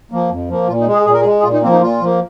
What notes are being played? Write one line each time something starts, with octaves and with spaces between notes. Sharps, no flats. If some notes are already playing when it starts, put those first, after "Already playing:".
F3 A#3
F2
F3 A#3
A#2 F4
D#4
G#3
G#4
A#2 G#4
A#4
G#4
G#3
G#4
A#2 F4
D#4
F3 A#3 C4
D#4
A#2 F4
F3 A#3